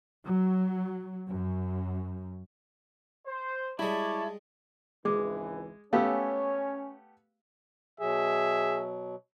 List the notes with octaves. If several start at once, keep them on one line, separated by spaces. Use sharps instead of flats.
F#3
F#2
C5
G3 G#3 E4 C#5 D5 A5
G#1 C#2 E3 G#3 G#4 D6
A3 B3 C#4 G4 C#5 F5 E6
B2 F#3 G#4 E5